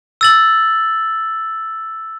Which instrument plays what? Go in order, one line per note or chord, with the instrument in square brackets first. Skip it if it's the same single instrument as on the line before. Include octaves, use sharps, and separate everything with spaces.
[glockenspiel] E6 A6 F#7